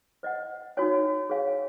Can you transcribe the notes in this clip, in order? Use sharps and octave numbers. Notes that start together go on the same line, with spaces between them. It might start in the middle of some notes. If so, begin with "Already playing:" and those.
C5 D#5 F#5
D#4 F#4 C#5 G#5
G#4 C#5 F5 G#5